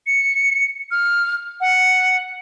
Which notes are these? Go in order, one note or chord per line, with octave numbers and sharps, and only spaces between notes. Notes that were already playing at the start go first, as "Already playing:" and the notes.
C#7
F6
F#5